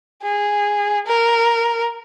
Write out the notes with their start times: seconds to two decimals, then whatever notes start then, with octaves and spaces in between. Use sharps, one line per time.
0.23 G#4
1.06 A#4